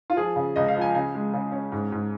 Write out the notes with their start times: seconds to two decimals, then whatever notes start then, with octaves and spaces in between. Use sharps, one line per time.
0.10 F4
0.17 F3 G#4
0.36 C#3
0.56 C#2 D#5
0.68 F5
0.76 F3
0.81 G#5
0.95 C#3 G#5
1.15 G#3
1.34 C#3
1.52 C#4
1.72 G#2
1.92 G#2